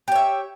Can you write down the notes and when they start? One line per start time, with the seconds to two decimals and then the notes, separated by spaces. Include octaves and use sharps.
0.08 G4
0.12 C#5
0.16 E5